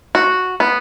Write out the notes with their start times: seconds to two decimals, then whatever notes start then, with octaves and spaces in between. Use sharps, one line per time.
0.15 F#4
0.60 B3